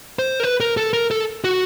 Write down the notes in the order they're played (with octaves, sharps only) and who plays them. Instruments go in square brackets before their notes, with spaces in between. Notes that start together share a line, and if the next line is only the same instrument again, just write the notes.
[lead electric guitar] C5
A#4
B4
A#4
A4
A#4
A4
F#4